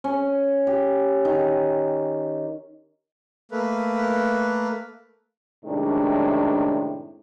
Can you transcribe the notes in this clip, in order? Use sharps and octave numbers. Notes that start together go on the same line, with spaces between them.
C#4
G4
D#3
A3 A#3 B4
F#2 A2 C3 D#3 G#3 D4